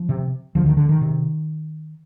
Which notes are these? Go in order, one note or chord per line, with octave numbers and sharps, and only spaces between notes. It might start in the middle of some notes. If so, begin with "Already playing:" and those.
Already playing: F3
C3
D2 F3
D#3
D3
D#3
C3